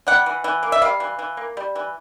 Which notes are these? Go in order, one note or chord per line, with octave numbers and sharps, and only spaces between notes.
G3 F#5
E3
E3
A#3
E5
G3 F5
E3
E3
A#3
G3
E3